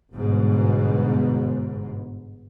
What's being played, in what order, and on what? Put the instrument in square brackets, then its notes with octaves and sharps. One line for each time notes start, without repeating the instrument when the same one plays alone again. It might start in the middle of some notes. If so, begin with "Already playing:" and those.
[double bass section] G1 G#2 B2